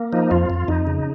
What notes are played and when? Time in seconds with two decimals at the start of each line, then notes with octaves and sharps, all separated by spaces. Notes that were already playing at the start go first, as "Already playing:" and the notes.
Already playing: A#3
0.13 F3 D#4
0.31 F2 F4
0.50 F2
0.68 F2 D#4
0.87 C#3